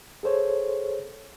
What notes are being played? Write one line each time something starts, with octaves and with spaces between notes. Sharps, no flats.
G#4 A4 C5 C#5